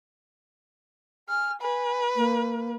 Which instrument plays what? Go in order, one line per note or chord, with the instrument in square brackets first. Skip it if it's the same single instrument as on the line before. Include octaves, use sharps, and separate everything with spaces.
[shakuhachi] G#5 [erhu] F6
[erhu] B4 [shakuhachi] G#5
[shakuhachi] A#3